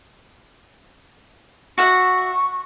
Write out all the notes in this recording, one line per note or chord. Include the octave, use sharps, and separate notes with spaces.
F#4 E5 F#5 C#6